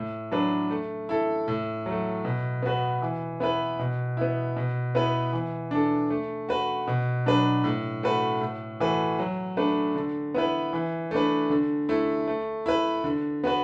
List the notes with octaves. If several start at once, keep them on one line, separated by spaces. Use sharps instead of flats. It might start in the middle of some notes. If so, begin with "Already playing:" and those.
Already playing: A2
F#3 D4 B4
A3
E4 A4
A2
F#3 A3
B2
B3 F#4 B4
E3
B3 E4 B4
B2
B3 E4
B2
B3 E4 B4
E3
D4 A4
A3
F#4 B4
B2
F#3 D4 B4
A2
A3 F#4 B4
A2
E3 A3 F#4 B4
F#3
A3 D4 B4
D3
B3 E4 B4
E3
A3 D4 B4
D3
A3 E4
A3
E4 B4
D3
B3 F#4 B4